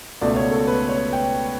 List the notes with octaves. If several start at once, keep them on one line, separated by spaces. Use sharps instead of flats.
C#2 B2 A3 D5
C#5
A4
B4
C#5
G5